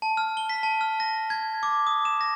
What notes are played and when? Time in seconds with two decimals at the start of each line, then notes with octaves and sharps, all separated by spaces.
0.02 A5
0.17 F6
0.37 G7
0.49 B6
0.63 A5
0.81 F6
1.00 A#6
1.30 G#6
1.63 D6
1.87 D#6
2.05 E7
2.21 A#6